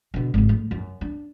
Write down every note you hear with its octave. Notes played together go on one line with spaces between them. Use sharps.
B2 D3
G#1 C#3
A2
F#2
D4